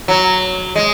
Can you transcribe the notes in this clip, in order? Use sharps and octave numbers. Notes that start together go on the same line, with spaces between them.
F#3
G#3